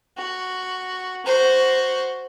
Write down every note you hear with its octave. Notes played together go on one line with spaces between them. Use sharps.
F#4
F#4 C5